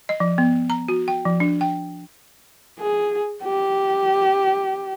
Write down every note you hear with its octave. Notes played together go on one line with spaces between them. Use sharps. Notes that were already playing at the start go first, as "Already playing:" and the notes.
D#5
F3
B3
A#5
F#4
G5
F3
D4
G5
G#4
G4